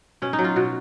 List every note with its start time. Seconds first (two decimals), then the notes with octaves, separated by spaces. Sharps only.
0.22 B2 C#4
0.33 D#4
0.39 F#3
0.44 F4
0.56 B2 F#4